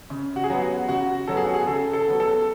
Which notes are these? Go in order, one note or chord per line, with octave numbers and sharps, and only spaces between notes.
C#3
F#4
G#4
F#3 B3 F#4
F#4
C#3 F#4
F#3 B3 A4
G#4
F#4
G#4
C#3 A4
A4
F#3 B3
A4